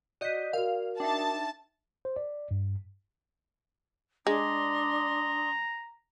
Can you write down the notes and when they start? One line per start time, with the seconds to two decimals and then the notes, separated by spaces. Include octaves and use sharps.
0.21 F#4 D5 D#5 G6 B6 D#7
0.53 F#4 A#4 F5
1.00 D4 D#4 E5 G5 A5
2.05 C5
2.16 D5
2.51 G2
4.27 G#3 D4 D5 A#5 C6 D#6